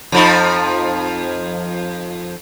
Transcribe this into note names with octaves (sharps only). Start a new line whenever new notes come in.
F2 F3 D#4